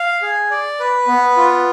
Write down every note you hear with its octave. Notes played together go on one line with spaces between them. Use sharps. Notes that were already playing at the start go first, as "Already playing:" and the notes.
Already playing: F5
G#4
D5
B4
B3
F4